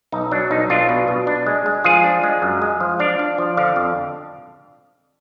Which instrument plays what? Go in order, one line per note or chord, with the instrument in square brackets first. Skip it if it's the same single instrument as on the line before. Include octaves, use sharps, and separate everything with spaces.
[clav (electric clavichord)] B1 D#4
F#3 D4
B1 D#4
B1 D4 F4
B2
B2
D4
G#3
G#3
F3 F4 G#4
D4
G#3
F#2
G#3
F3
D4 D5 F5
D4
F3
D3 D5 F5
F2